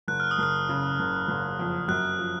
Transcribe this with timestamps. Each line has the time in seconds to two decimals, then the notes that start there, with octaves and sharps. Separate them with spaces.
0.08 F#1 F#6
0.20 F6
0.31 D#6
0.38 F#1 F6
0.69 C#3
0.99 F#1
1.28 F#1
1.59 F2
1.88 F#2 F#6
2.19 F3